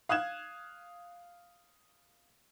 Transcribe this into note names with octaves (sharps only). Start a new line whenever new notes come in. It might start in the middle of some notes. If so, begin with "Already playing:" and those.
F5 D#6 F#6 G#6 E7